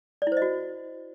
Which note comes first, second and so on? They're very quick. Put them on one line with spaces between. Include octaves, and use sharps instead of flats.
D5 E4 C5 D#5 F#4